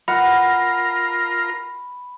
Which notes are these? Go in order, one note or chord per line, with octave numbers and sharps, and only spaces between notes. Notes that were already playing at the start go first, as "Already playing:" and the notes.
F4 A#4 F#5 B5